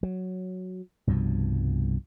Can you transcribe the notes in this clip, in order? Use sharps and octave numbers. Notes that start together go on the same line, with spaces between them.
F#3
C2 G2 B2 F3